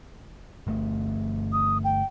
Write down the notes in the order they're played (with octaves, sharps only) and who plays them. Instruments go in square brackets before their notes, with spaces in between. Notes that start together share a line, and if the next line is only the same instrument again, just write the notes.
[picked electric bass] G1 A3
[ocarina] D#6
G5